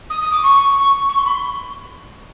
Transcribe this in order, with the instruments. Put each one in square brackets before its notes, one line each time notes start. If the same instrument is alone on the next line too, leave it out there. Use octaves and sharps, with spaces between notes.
[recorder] D#6
D#6
D6
C#6
C#6
C6
B5
C6